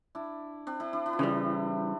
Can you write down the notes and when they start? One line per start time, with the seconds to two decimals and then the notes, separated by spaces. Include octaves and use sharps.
0.15 D4 E4
0.67 C4 D4
0.80 D4 E4
0.93 D4 E4
1.06 D4 E4
1.13 F4
1.19 C#3 E3 G3 D4 E4